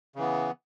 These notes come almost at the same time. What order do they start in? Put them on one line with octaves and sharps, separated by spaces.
C#3 E3 B3